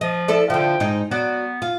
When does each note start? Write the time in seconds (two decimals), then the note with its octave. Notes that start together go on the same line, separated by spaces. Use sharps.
0.01 F3 D#5
0.28 E4 A4 D5
0.50 D3 F3 G5
0.80 G#2 D#4
1.11 F#3 B3 F#4 D5
1.62 F4